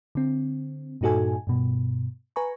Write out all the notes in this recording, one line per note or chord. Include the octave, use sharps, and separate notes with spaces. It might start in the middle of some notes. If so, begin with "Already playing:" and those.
D3 C4
G2 A#2 D#4 F#4 A4 G#5
G2 B2
B4 G#5 A#5 C#6